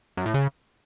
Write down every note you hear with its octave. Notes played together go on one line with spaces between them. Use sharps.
F#2
A2
C#3